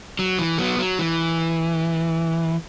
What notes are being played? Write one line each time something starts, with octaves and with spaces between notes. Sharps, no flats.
F#3
E3
F#3 B3
F#3
E3